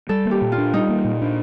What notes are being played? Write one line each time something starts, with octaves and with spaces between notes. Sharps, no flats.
G3 A4
A#3
G4
A#2
F4
D4
G3 D#4
A#3
A#2
D4